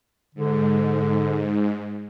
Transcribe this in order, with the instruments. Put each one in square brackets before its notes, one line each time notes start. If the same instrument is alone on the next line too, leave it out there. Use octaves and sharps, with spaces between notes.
[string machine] G#2 [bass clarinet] D3